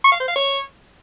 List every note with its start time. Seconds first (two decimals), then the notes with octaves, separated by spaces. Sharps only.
0.04 C#6
0.12 F5
0.20 C5
0.28 F5
0.36 C#5